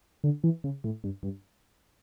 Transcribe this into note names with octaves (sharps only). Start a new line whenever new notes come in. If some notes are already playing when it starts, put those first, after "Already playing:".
D3
E3
C#3
A2
G2
G2